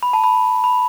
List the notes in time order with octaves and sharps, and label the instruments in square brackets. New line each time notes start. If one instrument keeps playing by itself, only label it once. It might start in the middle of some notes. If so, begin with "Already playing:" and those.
[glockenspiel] B5
A5
B5
B5